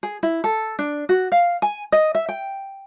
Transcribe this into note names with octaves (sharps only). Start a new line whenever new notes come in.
G#4
E4
A4
D4
F#4
F5
G#5
D#5
E5
G5